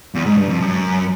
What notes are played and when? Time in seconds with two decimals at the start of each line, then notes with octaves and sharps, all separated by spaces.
0.15 E2
0.26 G#2
0.38 G2
0.49 F2
0.61 F#2